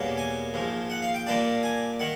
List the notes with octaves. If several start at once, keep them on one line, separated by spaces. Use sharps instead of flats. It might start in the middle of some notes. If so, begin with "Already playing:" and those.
Already playing: E2 B2 G3 A#3 C#4
G#5
A#1 G#2 F3
F#5
F5
G5
A#2 G3 A#3 D4 A5
G#5
D#3 F#5